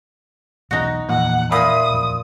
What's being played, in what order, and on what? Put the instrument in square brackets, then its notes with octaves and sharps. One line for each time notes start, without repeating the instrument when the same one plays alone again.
[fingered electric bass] B1 E2 [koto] D#4 F#4
[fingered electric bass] E2 E3 F3 [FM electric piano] A#2 [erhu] F#5
[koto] A#2 F4 [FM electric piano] E5 B5 C6 [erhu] D#6
[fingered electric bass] D#1 F2